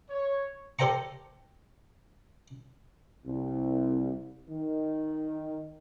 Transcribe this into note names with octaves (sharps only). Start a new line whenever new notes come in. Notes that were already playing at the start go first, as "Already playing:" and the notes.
C#5
G4 A4 C5 G5 A#5 C#6
C2
D#3